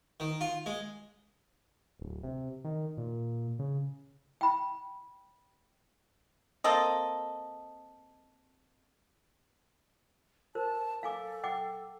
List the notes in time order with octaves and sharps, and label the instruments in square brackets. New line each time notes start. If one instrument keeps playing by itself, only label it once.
[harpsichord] D#3
F4
G#3
[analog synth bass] D1
C3
D#3
A#2
C#3
[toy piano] G5 B5
[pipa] A#3 C4 A4 D#5
[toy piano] A#4 C5 [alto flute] A5
[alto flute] A4 [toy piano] F5 G#5 D6
[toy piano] F#5 G5 D6